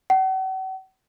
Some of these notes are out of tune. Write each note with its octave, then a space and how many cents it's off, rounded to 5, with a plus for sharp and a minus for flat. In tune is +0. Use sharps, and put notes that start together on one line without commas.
F#5 +40